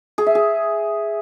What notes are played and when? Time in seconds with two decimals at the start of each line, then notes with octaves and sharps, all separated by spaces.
0.18 G#4
0.27 E5
0.35 G#4